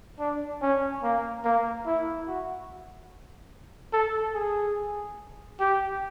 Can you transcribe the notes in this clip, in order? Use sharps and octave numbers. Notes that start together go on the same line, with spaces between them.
D4
C#4
A#3
A#3
E4
F#4
A4
G#4
G4